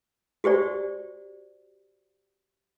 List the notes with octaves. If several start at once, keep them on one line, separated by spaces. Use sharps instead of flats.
F#4 G4 C5 D5